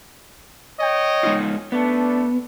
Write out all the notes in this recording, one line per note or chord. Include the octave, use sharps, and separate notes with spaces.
C#5 D#5 G5
G#3 D#4 F4
A3 B3 D4